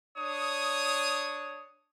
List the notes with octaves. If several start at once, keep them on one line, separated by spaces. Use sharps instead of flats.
D4 C#5 D#6